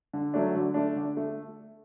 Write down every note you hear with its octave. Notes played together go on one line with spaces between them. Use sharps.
D3
F#3 A3 D4
D3
A3 D4
D3
A3